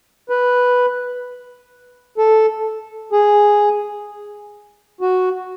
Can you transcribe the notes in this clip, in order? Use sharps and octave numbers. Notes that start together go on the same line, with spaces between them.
B4
A4
G#4
F#4